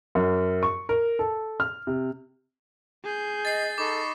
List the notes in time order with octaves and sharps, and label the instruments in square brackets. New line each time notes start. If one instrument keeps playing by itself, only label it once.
[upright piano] F#2
C#6
A#4
A4
F6
C3
[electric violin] G#4 G6
[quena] D#5 [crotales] A6 C7
[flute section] D#4 B5 C#6 [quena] A4 [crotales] D6